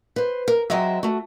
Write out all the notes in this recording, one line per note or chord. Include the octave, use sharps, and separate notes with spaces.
B4 C5
A#4
F#3 G#3 C4 D#5 E5
A3 F#4